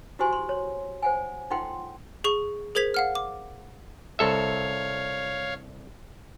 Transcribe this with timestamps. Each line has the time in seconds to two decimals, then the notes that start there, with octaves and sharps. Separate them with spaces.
0.19 E4 F#4 G4 C5 G#5 C6
0.33 C6
0.49 C#5
1.02 C5 F#5 G#5
1.50 D#4 F4 A4 F#5 G5 C6
2.24 G#4 C#6 F7
2.75 G#4 A#4 C5 G#6 B6 F7
2.94 F5 F#5 F6
3.15 D6
4.19 C2 A4 C#5 E5 F5